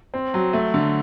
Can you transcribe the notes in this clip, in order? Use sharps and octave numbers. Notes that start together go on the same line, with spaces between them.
C4
F#3
A3
D3